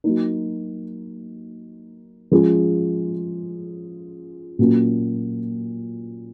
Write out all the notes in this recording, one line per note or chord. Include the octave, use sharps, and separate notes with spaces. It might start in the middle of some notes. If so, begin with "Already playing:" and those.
F#3 A#3 D#4
F3 G#3 C#4 F4 G#4
A#2 F#3 A#3 C#4